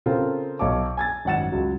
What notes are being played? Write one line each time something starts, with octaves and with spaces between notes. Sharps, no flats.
C#3 C4 F4 A4 A#4
B1 C#5 F5 A5 D6
G#5 G#6 A6
G#1 F#2 F#5 A6 E7
C#2 F#3